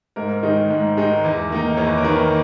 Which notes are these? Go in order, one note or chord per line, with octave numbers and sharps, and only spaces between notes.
G#2 A#4
D#3 G#3 D#4
G#2
D#3 G#3 D#4
E2
D#3 A#3 D#4
E2 C#5
B4
A#4
D#3 A#3 D#4 B4